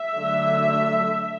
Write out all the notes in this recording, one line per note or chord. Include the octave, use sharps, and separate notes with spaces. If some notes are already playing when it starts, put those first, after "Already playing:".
Already playing: E5
D3 F#3 A3 D4